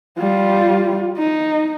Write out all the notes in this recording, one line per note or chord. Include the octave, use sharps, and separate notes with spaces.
G3 F4
D#4